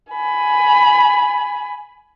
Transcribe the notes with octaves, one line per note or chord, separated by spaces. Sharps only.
G#5 B5